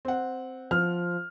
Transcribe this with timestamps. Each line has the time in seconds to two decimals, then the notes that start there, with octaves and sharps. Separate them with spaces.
0.05 C4 F#5
0.71 F3 F6